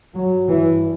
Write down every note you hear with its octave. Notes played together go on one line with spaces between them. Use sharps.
G2 F#3
E3